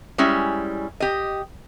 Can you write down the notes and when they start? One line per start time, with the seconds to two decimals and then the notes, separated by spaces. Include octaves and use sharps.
0.18 G3 G#3 C#4 E4
1.00 G4 D#5